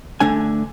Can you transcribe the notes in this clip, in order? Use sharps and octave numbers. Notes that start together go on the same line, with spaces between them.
D3 A3 D4 G#5